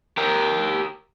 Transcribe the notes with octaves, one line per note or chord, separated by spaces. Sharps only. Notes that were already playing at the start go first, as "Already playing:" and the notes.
G4 A#4